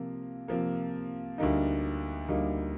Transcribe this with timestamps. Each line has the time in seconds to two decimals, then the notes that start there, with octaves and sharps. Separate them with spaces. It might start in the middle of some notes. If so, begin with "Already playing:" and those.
Already playing: C3 F3 A#3
0.48 C3 F3 A#3
1.38 D2 D3 G3 A#3 D#4
2.28 D2 D3 G3 A#3 D#4